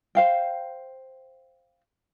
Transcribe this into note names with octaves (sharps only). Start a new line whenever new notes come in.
C5 F5 G5